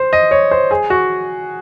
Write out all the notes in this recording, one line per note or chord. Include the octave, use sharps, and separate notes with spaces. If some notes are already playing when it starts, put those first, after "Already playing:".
Already playing: C5
D#5
C#5
C5
G#4
F#4